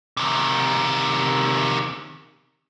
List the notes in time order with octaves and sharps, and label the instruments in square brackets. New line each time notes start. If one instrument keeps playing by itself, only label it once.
[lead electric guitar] C3 D#3